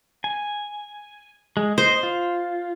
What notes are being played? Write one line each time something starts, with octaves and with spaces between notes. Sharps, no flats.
G#5
G#3
C5 D#5
F4